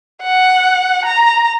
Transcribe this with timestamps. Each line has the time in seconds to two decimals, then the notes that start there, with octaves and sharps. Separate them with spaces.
0.23 F#5
1.05 A#5